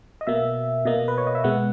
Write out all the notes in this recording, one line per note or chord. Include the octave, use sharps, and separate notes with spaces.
D#5
B2 A#3 E5
B2 A#3 D#5
B4
C#5
D#5
E5
B2 G#3 B3 F#5